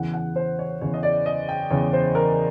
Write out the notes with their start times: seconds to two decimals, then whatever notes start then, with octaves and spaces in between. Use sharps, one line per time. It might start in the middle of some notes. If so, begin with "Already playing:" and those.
Already playing: E2 C#3 E3 F#5
0.14 F#5
0.36 C5
0.59 C#5
0.81 E2 C#3 E3 C#5
0.94 D#5
1.03 D5
1.26 D#5
1.49 G5
1.70 E2 C#3 E3 C#5
1.93 C5
2.15 A#4